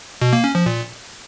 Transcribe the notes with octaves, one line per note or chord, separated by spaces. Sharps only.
B2
A#3
C#4
F3
A#2